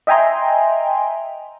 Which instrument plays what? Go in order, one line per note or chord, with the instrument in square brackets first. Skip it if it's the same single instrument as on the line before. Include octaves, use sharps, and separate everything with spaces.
[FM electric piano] D#5 E5 G5 G#5 A#5 C6